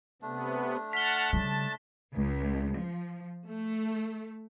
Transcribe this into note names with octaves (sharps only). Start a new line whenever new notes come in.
C3 A3 B3 D4
F#5 A5 F6 B6 G7
C#3 G3 A5
C#2
F3
A3